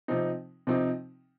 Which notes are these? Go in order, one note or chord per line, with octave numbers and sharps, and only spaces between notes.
C3 F3 C4 D#4
C3 F3 C4 D#4